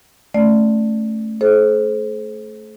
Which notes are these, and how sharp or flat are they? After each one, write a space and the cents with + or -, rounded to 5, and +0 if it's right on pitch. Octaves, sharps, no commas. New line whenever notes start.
A3 -5 C#4 +0 D5 +0
A4 -45 C5 +15